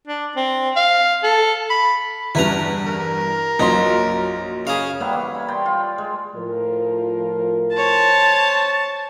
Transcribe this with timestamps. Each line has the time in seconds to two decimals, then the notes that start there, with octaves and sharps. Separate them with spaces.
0.07 D4
0.36 C4
0.76 F5
1.23 A4
1.70 B5
2.35 E2 G2 E4 B4 A#5
2.87 A#4
3.59 A#1 F#2 D#4 C6
4.67 C#3 G#4 F5
5.00 G3 A#3 B3 E4
5.12 E3 A#3 C#5
5.35 B5
5.48 D5 G5 C6
5.66 F4
5.98 G#3
6.36 A2 F3 A#4
7.76 C5 C#5 A5